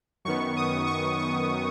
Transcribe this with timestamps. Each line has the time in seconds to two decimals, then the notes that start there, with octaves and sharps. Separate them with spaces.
0.25 F#2 D#3 B3 C#6
0.56 D#6
0.87 C#6
1.18 C#6